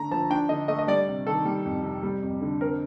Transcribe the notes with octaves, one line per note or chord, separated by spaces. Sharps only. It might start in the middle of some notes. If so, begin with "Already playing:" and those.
Already playing: D3 A3 A#5
F3 A5
D4 G5
D3 D#5
A3 D#5
D#5
G3 D5
C3
D#3 A4
G3
F2
C3
G3
F2
D3
C4 A#4